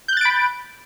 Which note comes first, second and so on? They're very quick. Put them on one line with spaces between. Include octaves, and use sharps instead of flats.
G6 F#6 A6 D7 B5